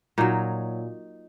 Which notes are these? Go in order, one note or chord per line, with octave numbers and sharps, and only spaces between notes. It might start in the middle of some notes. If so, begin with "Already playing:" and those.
A#2 F#3 D#4